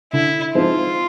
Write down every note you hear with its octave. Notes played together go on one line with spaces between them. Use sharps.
D3 E4
F3 G#3 C4 D#4 F4